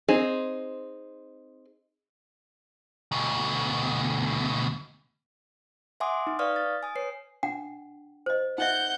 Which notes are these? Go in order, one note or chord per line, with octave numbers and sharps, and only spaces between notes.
C4 D#4 G#4
D2 B2
E5 F#5 G#5 C6 D6 D#6
D#4
B4 D5 F5 C#6 D#6 F6
A6
G#5 D#6
B4 C#5 C7
D4 F#5 G5
C5 D#5
D#4 D#5 E5 F#5 G6